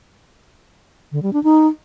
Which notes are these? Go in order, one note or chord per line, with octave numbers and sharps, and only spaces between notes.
D3
G3
D4
D#4